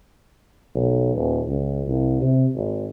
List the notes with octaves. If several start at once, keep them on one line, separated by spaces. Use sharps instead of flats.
B1
D#1
C#2
C2
C3
G#1